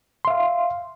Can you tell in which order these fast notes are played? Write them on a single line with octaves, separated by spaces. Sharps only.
C6 E5 F5